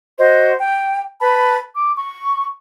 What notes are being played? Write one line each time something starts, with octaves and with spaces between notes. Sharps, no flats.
F#4 C5 D#5
G5
B4 A5 B5
D6
C#6